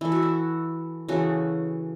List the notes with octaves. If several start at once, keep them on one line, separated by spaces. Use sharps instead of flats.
E3 A3 E4
F#4
E4
C#3 E3 A3 F#4